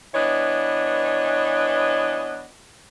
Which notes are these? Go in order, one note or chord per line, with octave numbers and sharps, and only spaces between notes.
E3 B3 D4 C#5 D#5